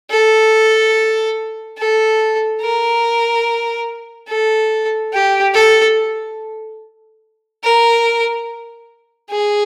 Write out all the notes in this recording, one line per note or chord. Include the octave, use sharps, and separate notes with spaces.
A4
A4
A#4
A4
G4
A4
A#4
G#4